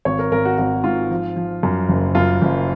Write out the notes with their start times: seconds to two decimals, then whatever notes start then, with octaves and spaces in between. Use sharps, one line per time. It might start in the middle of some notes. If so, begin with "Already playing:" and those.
0.05 G#1 C#5
0.19 A#4
0.32 G#1 A#4
0.45 F#4
0.58 G#1 F#4
0.84 G#2 F4
1.10 F3
1.36 F3
1.63 F#2
1.89 F#1
2.15 F#2 F4
2.41 F#1